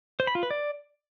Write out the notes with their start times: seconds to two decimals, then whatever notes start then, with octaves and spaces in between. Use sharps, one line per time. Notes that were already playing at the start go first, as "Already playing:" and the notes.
0.20 C5
0.27 B5
0.35 F4
0.43 B4
0.51 D5